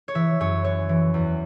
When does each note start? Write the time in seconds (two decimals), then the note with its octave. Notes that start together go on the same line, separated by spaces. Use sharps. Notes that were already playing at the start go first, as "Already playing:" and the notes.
0.08 C#5
0.15 E3 E5
0.40 F#2 C#5
0.64 E3 C#5
0.89 E3
1.14 E2